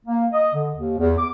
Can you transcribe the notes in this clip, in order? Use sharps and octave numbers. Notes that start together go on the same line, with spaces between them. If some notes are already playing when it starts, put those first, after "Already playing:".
A#3
D#5
D3
D#2
E2
D6